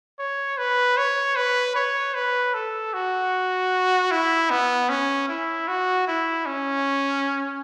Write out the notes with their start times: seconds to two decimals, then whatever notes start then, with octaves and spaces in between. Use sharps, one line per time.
0.19 C#5
0.58 B4
0.97 C#5
1.36 B4
1.76 C#5
2.15 B4
2.54 A4
2.94 F#4
4.11 E4
4.51 B3
4.89 C#4
5.29 E4
5.68 F#4
6.08 E4
6.46 C#4